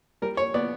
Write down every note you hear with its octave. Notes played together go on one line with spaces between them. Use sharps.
G3 A#4
C#5
B3 D5